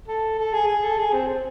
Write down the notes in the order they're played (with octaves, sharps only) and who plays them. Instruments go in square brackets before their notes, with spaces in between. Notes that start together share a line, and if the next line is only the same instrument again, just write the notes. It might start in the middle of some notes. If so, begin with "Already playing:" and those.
[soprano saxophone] A4
A4
G#4
G#4
A4
G#4
C4
C4